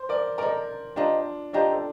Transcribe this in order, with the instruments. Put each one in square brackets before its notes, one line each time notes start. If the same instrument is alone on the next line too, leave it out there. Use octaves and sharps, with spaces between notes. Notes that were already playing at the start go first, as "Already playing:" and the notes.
Already playing: [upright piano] C5
A#4 D5
[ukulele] A4 D#5 A#5 [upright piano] A#4 D5
[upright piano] D4 F4 [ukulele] G4 C5 D#5 A#5
[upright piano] D4 F4 [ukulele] G4 C5 D#5 A#5
[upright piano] A4